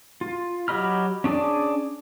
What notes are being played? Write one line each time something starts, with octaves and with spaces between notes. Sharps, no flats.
F4
F#3 G4 D#5 B5 F6
C#4 D4 G#4 D5